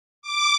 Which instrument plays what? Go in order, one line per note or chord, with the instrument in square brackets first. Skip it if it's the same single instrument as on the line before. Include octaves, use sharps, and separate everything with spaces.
[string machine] D6